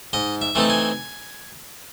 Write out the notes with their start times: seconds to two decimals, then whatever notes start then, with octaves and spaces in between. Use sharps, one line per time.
0.13 G#2 D#5
0.41 E5
0.55 E3 A3 C4 D#4 A5
0.70 G#5